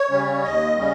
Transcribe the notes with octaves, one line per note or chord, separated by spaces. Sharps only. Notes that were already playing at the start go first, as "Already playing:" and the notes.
Already playing: C#5
C#3 G3 C#4
D#2 D#5
C#3 G3 C#4